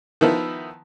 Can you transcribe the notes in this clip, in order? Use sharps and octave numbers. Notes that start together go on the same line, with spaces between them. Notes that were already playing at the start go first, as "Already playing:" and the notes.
D#3 F3 B3 E4